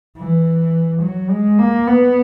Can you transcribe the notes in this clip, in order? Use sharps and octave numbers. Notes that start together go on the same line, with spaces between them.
E3
F#3
G#3
A#3
B3